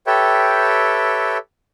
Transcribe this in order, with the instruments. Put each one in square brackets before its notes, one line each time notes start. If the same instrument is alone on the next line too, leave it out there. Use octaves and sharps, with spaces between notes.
[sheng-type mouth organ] G4 A4 B4 C#5 E5 G5